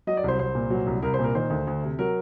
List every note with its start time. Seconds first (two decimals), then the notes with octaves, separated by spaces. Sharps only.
0.07 F#3 D#5
0.17 D5
0.24 C2 C5
0.39 C2 C5
0.55 A#2
0.70 F#3
0.87 C2
1.02 C2 A#4
1.14 C5
1.19 A#2
1.24 A#4
1.35 D#3 C5
1.50 D2
1.67 D2
1.83 C3
1.99 F#3 A#4